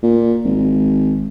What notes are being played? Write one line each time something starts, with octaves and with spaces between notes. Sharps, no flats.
A#2
G#1